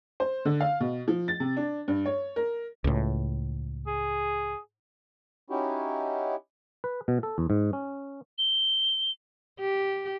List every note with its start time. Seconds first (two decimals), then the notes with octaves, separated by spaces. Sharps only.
0.20 C5
0.45 D3
0.61 F5
0.80 B2
1.08 F3
1.28 A6
1.40 C3
1.57 D4
1.88 G2
2.05 C#5
2.36 A#4
2.84 C#2 A2
3.87 G#4
5.50 C#4 D#4 E4 F#4 G4
6.84 B4
7.08 B2
7.23 A4
7.38 E2
7.50 G#2
7.73 C#4
8.38 G7
9.60 G4